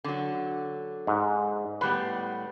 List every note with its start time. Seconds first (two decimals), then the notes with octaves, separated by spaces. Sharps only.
0.04 D3 F#3
1.07 G#2
1.81 A2 G3 B3 B4